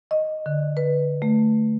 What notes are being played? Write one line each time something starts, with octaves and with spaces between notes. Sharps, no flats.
D#5
D3
B4
A3